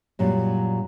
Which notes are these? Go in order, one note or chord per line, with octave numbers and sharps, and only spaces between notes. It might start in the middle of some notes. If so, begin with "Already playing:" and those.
F#2 A#2 F#3 G3